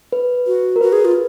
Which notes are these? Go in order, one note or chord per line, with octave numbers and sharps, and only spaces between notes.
B4
F#4
A#4
F#4 B4
G#4
F4